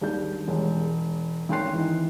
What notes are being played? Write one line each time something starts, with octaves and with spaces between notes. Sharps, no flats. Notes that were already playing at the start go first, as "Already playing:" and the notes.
D#2 G3 D4 G6
E1 G#3 C#4
G#1 C#4 G5 C6 F#6 C7
E3 D#4